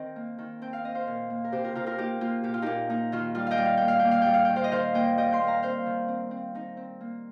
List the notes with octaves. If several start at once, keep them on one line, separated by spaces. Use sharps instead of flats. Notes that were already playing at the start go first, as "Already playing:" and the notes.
Already playing: D#3 C4 D#5 G5
A#3
D#3
C4 G5
F5
C4 D#5
C5 F5
A#2
A#3
A#4
C3 G4 C5
F4 A#4
C3 F4 A#4
F4 A#4
A#3 D#4 G4
A#3 F4
A#2 G4
F4
A#2 D#4 G4
A#3 D#4
D#3 F4
G3 F4
D#5 F5 G5
G3
F5
A#3 G5
F5
A#3 G5
F5
G3 G5
F5
D#3 G5
C5 F5
D#5
D#3 C5 F5
A#3 D#5 G5
G3 D#5 G5
G5 C6
A#3
F5 A#5
C4 C5 F5
D#3
C4
C4
C4 D#4
C4
A#3